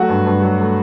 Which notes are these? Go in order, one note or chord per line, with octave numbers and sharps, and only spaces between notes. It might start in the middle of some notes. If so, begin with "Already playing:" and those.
Already playing: F#3 A3 F#4 F#5
G2
G2
F#3
A3